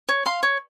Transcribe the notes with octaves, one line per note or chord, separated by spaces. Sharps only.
C#5
F5 C6
C#5